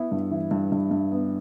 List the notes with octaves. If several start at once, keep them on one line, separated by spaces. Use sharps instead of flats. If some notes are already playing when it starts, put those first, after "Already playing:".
Already playing: B3 E4
G2
E3
G2
G2
G2
B3